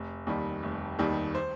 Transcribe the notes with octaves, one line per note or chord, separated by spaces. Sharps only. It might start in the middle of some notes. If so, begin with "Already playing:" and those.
Already playing: F1
D#2 D#3 G3
F1
D#2 D#3 G3
C5